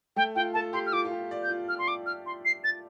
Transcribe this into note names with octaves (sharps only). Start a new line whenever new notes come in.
A3 G5
F4 G5
A4 A5
G4 C6
F6
F4 D6
F4
G4
D5
G6
F4
F6
C6
D6
F6
C6
C7
A6